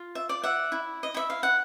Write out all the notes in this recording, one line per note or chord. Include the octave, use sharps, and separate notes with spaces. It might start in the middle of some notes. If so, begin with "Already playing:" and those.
Already playing: F4
E5
D5
E5 F#5
E4
D#5
E4 E5
F5
F#5